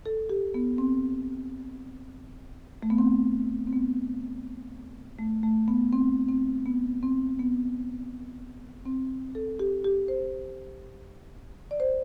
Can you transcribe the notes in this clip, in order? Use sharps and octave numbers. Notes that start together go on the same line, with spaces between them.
A4
G4
B3
C4
A3
B3
C4
C4
B3
A3
A3
B3
C4
C4
B3
C4
B3
C4
A4
G4
G4
C5
D5
C5